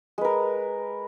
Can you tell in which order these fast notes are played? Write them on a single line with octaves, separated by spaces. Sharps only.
G#3 B4 A#4